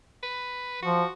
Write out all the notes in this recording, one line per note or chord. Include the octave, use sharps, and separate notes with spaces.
B4
F3 F#4